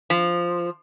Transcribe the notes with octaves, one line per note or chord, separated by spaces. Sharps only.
F3